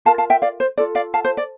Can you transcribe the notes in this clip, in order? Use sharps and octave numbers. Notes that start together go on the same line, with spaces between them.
F4 A#4 F5 A5
F5 A5
E5 G5
D5 F5
C5
F4 A4 D5
D5 F5
F5 A5
C5
D5